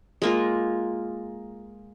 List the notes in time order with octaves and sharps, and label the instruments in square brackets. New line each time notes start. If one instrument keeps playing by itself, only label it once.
[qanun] G#3 A#3 F4